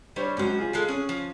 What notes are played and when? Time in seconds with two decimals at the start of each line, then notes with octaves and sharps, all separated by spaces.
0.16 G3 D4 C5 C#5
0.37 C#2 F#3 C#4 C5 F6
0.59 F4 G#4
0.73 G#3 A4 F5
0.89 C#4 G#4
1.09 F3